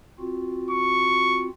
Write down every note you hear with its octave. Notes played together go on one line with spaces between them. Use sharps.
C4 F4 F#4
C#6